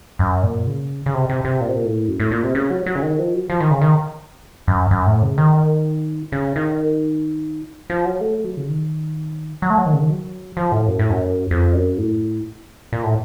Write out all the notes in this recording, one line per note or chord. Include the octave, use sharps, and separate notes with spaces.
F#2
A#2
C#3
C#3
C3
C3
C3
A#2
C3
A#2
A2
F#2
A2
A#2
C3
C#3
F#3
F#3
C#3
D#3
F3
F#3
F3
D#3
C#3
D#3
F#2
F#2
A2
C#3
D#3
C#3
D#3
F3
F#3
A3
F#3
C#3
D#3
F#3
A3
F#3
D#3
C#3
D#3
F#3
F3
A2
F#2
A2
F#2
F2
F#2
A2
A#2
A2